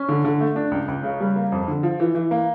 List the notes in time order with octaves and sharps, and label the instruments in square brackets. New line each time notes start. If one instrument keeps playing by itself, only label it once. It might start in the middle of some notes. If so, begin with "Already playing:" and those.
Already playing: [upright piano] C#4
D3
D3
A3
D4
C#2
C#2
C#3
G3
A#3
F2
D3
F3
E3
E3
A#3